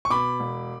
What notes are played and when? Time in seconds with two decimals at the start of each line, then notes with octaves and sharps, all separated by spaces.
0.05 C#6
0.10 B2 B5 D6
0.40 E1